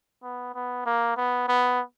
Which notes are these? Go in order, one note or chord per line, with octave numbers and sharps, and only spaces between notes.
B3
B3
A#3
B3
B3